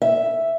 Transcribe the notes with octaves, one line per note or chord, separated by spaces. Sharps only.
E5